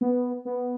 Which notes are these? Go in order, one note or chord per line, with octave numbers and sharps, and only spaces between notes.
B3
B3